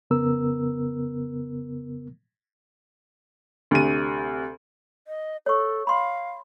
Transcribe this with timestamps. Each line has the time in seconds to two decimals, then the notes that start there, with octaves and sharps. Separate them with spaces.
0.10 F2 C#3 B3 A#4 E6
3.71 D2 C3 D#7
5.08 D#5
5.46 A4 C#5 C#6
5.87 F5 B5 C6